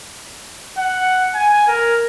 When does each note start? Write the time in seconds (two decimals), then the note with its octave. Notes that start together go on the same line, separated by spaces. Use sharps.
0.77 F#5
1.34 G#5
1.68 A#4